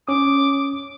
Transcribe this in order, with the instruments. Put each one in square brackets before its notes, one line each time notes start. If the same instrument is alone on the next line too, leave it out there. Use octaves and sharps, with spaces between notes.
[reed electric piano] C#4 D#6 [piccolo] D6